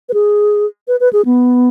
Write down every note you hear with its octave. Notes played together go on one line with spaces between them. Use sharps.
B4
G#4
B4
B4
G#4
B3